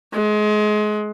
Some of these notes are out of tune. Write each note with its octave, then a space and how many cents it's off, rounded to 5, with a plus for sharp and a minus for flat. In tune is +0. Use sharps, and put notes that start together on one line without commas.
G#3 +30